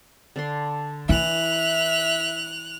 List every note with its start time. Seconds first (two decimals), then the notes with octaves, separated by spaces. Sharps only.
0.36 D3 D4 C6
1.09 E3 E4 E5 F#6 F7